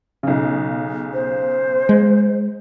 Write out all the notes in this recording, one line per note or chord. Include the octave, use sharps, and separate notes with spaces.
B1 C#3
C5
G#3